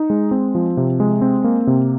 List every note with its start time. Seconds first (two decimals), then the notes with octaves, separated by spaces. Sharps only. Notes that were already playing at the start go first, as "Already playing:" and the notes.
Already playing: D#4
0.10 G#3
0.31 C4
0.55 F3
0.77 C3
1.00 G#3
1.22 C4
1.44 A#3
1.67 C3